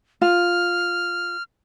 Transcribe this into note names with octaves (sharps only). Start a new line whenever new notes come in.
F4 F6